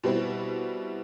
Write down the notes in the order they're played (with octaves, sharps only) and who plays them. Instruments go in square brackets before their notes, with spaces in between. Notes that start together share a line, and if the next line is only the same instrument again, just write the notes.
[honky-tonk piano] B2 G3 C4 E4